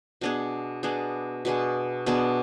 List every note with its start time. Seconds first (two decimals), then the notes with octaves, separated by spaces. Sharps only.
0.21 B2 B3 D4 G#4
0.83 B2 B3 D4 G#4
1.45 B2 B3 D4 G#4
2.06 B2 B3 D4 G#4